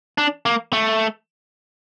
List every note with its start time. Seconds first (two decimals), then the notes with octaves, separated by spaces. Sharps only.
0.18 D4
0.46 A#3
0.73 A3